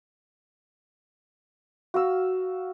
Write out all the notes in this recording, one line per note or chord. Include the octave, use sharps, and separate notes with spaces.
F#4 F5 E6